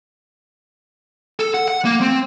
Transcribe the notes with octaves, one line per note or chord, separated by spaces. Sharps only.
A4
F#5
F#5
A#3
C4